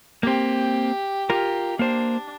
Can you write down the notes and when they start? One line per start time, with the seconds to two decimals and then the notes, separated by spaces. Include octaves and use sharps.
0.23 A#3 C4 G4
1.30 F4 G4 A#4
1.79 A#3 D4 C5